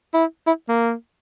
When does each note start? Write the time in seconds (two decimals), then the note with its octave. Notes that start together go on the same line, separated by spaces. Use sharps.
0.14 E4
0.47 E4
0.69 A#3